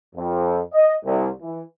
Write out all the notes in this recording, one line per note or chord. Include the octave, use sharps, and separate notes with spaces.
F2
D#5
C2
E3